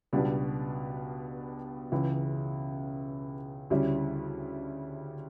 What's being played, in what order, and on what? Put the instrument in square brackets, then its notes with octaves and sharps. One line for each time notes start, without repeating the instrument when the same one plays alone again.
[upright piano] C#2 B2 G3 B3 D4
C#2 C#3 E3
D2 C#3 G3 C#4 E4